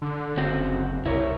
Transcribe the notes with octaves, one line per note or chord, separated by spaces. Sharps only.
D3
F#1 C#3 C4 F#4
C2 E4 A#4 C#5